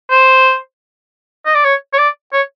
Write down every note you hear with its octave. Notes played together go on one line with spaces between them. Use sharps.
C5
D#5
D5
C#5
C#5
D5
C#5